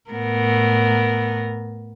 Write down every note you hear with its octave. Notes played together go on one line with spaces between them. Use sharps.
A2 B3 A#4